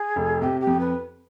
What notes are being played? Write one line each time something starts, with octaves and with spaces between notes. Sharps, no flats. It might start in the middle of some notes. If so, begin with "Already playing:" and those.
Already playing: G#4
F1
C3 G4
G4
F2
B4